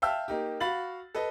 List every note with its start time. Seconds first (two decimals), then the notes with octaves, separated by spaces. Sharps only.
0.02 E5 F5 G5 A5 E6 F6
0.28 A#3 D#4 G4
0.60 F#4 F5 B5 A6 F#7
1.15 A4 B4 D#5